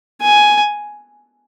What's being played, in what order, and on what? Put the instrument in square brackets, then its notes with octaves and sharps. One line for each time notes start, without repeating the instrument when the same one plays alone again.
[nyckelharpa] G#5